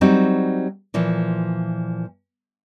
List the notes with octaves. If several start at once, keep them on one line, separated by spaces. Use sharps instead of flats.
F#3 G3 C4 D#4 F#4
A#2 E3 F3